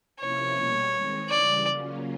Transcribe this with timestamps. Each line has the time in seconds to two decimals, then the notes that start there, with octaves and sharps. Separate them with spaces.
0.20 C3 F3 A#3 C#4 E4 C#5
0.56 B2 G3 A#3
0.93 D#3 G#3 C4 D#4
1.29 C#3 E3 G3 D5
1.66 C#3 F#3 A#3 C#4 F4